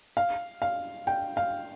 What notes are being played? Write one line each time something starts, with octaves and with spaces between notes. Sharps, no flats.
F5
F5
G5
F5